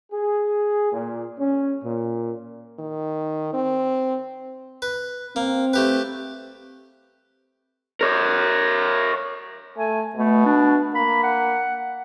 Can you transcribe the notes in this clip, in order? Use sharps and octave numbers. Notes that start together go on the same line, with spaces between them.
G#4
A#2
C#4
A#2
D#3
C4
B4
A#3 C4
A3 G4 B4
A#4 C#5
A3 G#5
B2 A3
D4
A#3 B5
F#5